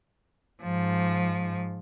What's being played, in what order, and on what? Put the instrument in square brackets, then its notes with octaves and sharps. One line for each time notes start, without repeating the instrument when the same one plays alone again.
[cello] G#2 F3